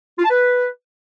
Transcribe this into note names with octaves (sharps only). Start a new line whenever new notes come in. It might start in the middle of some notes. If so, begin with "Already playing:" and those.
F4
A5
B4